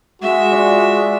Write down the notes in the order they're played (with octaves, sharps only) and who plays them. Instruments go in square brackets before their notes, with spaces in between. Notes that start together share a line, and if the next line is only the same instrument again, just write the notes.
[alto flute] G#3 [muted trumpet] F#4 [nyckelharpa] E5
[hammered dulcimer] F4 D5